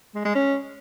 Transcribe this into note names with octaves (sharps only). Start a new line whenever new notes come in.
G#3
G#3
C#4